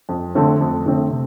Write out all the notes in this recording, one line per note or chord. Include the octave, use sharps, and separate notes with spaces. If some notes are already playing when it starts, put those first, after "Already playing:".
F2
D3 A3 C4
F2
D3 A3 C4
C3